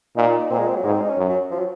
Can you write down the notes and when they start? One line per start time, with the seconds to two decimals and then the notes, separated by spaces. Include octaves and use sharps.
0.16 A#2 D#4
0.50 A#2 C4
0.58 G#3
0.68 C4
0.75 F#3
0.84 G#2 G#3
0.92 C4
1.01 D#4
1.09 C#4
1.17 F#2
1.28 F#3
1.51 F3
1.59 F#3